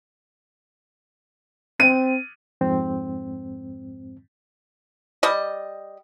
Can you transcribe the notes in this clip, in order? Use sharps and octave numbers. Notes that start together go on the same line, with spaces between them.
C4 D#7
F2 G#2 C4
G3 D#5